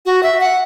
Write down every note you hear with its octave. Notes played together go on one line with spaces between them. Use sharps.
F#4
E5
F#5